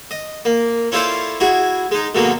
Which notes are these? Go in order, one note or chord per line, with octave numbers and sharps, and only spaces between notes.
D#5
A#3
C#4 E4 F4 A4 C5 D5
E4 F#4 G#4
G#3 D#4
G#2 B2 D3 D#3 F#3 A#3